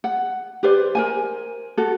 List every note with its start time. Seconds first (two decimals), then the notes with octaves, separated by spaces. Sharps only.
0.04 F#5
0.63 G4 B4 C5 D5
0.95 A#4 C5 G#5
1.78 F#4 A4